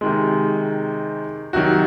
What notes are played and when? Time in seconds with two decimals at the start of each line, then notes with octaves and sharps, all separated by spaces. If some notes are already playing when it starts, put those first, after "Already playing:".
0.01 C3 D#3 G#3
1.53 C3 D#3 F#3 F#4